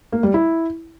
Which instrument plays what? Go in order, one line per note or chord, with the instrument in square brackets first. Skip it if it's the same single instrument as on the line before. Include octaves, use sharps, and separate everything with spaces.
[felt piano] A#3
G3
E4